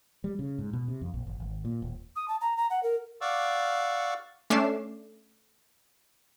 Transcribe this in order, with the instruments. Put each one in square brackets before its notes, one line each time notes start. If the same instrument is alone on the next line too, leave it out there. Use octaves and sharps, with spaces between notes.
[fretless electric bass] G3
C#3
G#2
B2
C3
F2
A#1
G1
G#1
A#2
D#1
[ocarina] D#6
A5
A#5
A#5
F#5
A#4
[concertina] D5 F5 F#5 C#6 D6 E6
[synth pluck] A3 C#4 D4 D6 C7 E7